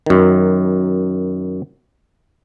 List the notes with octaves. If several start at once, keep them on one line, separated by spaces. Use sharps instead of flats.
F#2 D#3